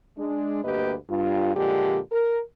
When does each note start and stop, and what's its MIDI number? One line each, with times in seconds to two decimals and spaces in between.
0.18 0.61 56
0.18 0.61 62
0.64 0.94 38
0.64 0.94 43
0.64 0.94 58
0.64 0.94 67
0.64 0.94 71
0.64 0.94 75
1.10 1.53 43
1.10 1.53 65
1.56 1.97 46
1.56 1.97 50
1.56 1.97 53
1.56 1.97 56
1.56 1.97 67
2.12 2.38 70